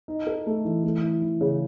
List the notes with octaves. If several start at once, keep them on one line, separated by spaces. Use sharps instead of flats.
D#4
A4
A3
E3
A3
E4
E3
C#3